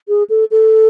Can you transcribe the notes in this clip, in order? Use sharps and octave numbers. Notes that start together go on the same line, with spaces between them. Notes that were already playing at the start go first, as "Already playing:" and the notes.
G#4
A4
A4